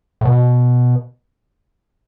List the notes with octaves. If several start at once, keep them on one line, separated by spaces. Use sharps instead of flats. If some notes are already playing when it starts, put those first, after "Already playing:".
A2
B2